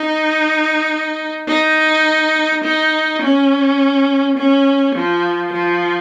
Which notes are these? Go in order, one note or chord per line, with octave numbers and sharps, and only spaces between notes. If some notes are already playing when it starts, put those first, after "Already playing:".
Already playing: D#4
D#4
D#4
C#4
C#4
F3
F3